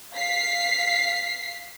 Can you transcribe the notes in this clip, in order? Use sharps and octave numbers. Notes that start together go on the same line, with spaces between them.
F5 B6 C7